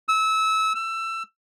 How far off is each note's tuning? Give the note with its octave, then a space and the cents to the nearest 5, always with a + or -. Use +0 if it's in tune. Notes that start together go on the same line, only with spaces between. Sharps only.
E6 -25
E6 +20